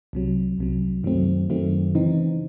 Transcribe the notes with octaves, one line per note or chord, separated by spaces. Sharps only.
C2 C3 F#3
C2 C3 F#3
F#2 D#3 F#3 A3 C4
F#2 D#3 F#3 A3 C4
C#3 E3 C4 D#4